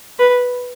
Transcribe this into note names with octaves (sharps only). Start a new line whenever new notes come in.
B4